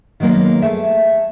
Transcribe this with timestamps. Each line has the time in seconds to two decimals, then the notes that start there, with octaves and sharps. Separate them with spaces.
0.20 D#3 F#3 G#3 A#3 B3
0.62 A3 G#4 E5